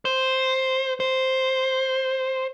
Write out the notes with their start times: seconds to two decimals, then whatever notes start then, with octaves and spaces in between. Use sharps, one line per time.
0.05 C5
1.00 C5